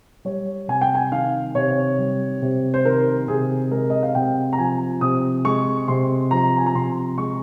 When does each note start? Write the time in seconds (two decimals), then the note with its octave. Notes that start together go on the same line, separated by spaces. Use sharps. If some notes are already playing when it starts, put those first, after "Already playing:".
0.25 G3 C#5
0.68 C3 G#5
0.81 G5
0.95 G#5
1.12 D#3 F5
1.55 C3 C#5
1.99 G3
2.42 C3
2.74 C5
2.85 D#3 A#4
3.28 C3 G#4
3.71 G#3 A#4
3.90 D#5
4.03 F5
4.15 C3 G5
4.53 A#5
4.58 F3 G#5
5.01 C3 D#6
5.45 G#3 C#6
5.88 C3 C6
6.31 F3 A#5
6.58 G#5
6.66 A#5
6.75 C3 C6
7.18 G#3 C#6